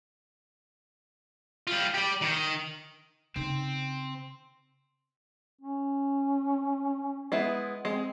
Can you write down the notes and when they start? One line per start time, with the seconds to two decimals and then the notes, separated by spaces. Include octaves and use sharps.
1.67 G3 F4
1.94 G4 D5
2.22 D#3
3.36 C#3 C4 D#4
5.61 C#4
7.32 G#3 B3 E4
7.85 G#3 C4